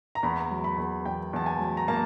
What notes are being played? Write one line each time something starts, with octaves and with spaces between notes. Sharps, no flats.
A#5
E2 B5
F#3
B5
E2
E2 G5
E2 A5
G#5
F#3
A#5
A#3 A5